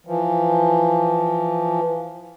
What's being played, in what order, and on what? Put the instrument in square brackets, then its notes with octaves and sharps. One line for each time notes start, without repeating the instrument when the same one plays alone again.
[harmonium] E3 F3